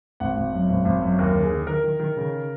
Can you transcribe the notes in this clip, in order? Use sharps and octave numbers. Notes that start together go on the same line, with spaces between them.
G#1 F#5
G#1
F#2
G#1
G#1
F#2
D#2 A#4
D#3
G#4
D#3
D#3 A#4
D#3
D#3
C#3